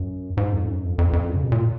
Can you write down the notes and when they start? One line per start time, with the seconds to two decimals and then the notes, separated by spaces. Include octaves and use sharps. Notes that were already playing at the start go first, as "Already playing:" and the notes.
Already playing: F#2
0.37 G#2
0.52 F2
0.68 F#2
0.83 F2
0.98 F2
1.13 F2
1.29 F#2
1.36 C#3
1.43 B2
1.52 A#2